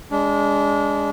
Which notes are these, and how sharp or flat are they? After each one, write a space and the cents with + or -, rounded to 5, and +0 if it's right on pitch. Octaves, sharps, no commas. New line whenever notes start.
G#3 -15 D4 -30